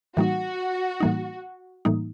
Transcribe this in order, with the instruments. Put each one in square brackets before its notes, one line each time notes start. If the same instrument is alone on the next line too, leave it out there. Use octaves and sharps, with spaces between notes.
[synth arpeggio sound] A2 E3 G3 A#3 D#4 [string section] F#4
[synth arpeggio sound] A2 E3 G3 A#3 D#4
A2 E3 G3 A#3 D#4